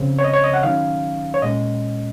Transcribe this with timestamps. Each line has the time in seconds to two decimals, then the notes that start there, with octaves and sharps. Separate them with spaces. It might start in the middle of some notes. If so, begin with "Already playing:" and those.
Already playing: C#3 F3 C4
0.19 C#5
0.24 D#5
0.33 C#5
0.44 D#5
0.54 F#5
0.63 D#3 F#3 C#4 F5
1.34 C#5
1.42 A#2 G#3 C#4 D#5